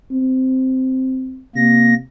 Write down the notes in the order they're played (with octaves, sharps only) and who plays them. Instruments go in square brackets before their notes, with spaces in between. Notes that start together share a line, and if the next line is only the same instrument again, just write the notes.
[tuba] C4
[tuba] C3 [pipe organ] A#3 A#6